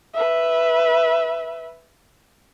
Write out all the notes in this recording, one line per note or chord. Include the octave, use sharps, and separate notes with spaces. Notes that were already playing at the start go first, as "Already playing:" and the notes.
B4 E5